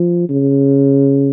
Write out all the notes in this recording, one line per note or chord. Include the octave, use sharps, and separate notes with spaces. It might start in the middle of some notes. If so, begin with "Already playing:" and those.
Already playing: F3
C#3